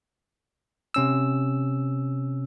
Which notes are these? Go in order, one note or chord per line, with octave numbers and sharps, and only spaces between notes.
C3 C#4 E6